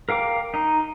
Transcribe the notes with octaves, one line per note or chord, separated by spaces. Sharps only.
A#4 F5 G5 D6
D#4